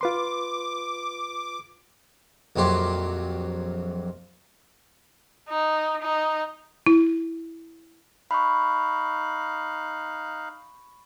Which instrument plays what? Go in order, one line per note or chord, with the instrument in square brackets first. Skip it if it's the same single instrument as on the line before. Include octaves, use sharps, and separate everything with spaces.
[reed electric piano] F4 B4 C6 [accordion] D6
[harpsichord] A#1 F2 F#3 G4 C6
[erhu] D#4
D#4
[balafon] E4
[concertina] D#4 F5 F#6 [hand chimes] B5 C#6